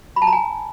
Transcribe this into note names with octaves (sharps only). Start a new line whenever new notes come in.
B5
A5
A#5
G#5